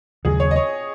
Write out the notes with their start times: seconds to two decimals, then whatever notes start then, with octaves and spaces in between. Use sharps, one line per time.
0.25 D#2 C#3 F#3 G#4
0.40 C#5
0.51 D#5
0.56 C#5